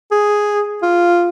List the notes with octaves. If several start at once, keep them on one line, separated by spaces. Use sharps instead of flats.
G#4
F4